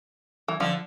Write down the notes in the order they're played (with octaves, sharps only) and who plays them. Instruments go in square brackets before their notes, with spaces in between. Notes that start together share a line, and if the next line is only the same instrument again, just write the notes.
[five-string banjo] E3
[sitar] D3 [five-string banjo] F3